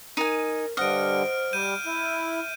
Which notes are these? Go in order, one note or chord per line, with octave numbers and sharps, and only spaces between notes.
D#4 A#4 G#5
G2 D3 C5 D#5 F#5 F6 D7
G3 G6 D#7
E4 E5